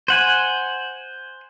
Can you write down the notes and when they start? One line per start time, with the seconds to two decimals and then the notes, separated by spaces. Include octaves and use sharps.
0.08 C5 F#5 G#5